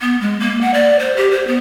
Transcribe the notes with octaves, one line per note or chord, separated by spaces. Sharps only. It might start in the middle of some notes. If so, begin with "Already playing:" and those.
B3
G#3
A#3
F#5
D5
C5
G4
C5
B3